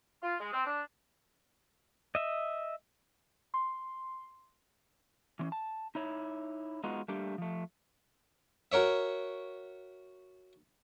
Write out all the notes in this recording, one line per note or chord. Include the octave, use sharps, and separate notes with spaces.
F4
G#3
C4
D4
D#5 E5
C6
E3 C4 C#4
A5
D#4 E4 C#5
G#3 B3 D#4 F4 F#4
G3 A3 A#3 D4 G4
F3 A3
F#4 A#4 C#5 E5